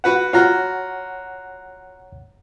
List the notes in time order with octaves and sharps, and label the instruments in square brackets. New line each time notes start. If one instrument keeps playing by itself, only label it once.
[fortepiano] F#4 B4 F#5
[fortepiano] F4 F#4 [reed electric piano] C#5 F#5 A#5